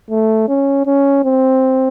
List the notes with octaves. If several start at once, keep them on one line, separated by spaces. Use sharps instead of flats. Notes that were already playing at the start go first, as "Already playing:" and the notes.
A3
C#4
C#4
C4